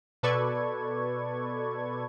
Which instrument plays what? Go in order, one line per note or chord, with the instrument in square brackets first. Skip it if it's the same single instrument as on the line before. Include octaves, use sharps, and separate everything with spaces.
[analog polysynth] B2 A4 B4 D5 C#6 G#6